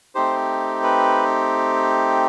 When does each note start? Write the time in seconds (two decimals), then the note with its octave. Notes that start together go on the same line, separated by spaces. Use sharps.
0.15 A3 C4 D#4 G4 C5
0.83 B4